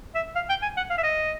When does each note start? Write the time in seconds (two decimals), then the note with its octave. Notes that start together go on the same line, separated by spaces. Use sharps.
0.15 E5
0.35 F5
0.49 G5
0.62 G#5
0.77 F#5
0.90 F5
0.98 E5
1.03 D#5